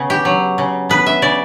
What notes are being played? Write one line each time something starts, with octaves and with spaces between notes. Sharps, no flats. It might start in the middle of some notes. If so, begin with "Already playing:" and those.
Already playing: C#3 B3 B4
G4
F#3
C#3
B3 B4
E5
C#3 D5